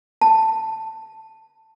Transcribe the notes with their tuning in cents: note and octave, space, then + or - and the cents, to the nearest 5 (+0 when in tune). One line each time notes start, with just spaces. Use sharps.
A5 +10